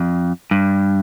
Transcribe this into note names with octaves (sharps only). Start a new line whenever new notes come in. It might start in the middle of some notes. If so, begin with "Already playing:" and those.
Already playing: F2
G2